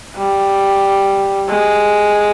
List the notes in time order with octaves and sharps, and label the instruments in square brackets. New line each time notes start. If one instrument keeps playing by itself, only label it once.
[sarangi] G3
G#3